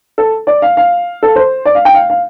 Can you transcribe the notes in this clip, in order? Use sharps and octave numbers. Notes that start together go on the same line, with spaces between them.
A4
D5
F5
F5
A4
C5
D5
F5
G5
F5
F5